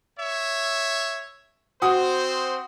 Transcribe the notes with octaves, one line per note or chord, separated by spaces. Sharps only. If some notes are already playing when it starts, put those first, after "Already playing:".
C#5 E5
C4 F#4 C5 D#6